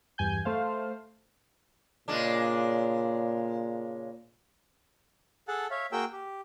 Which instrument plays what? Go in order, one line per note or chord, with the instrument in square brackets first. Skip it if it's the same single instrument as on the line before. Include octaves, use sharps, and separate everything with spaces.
[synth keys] E2 G2 G#5 G6
A3 C5 F5
[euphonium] A#2 [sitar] C#3 G#3 D4
[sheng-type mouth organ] G#4 A4 F#5 A5
C#5 E5 F5
A#3 F#4 G#4 A#4 G5 E6
G4